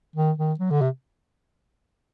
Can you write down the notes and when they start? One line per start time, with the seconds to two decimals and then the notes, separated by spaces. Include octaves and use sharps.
0.16 D#3
0.37 D#3
0.59 F#3
0.71 D3
0.81 C3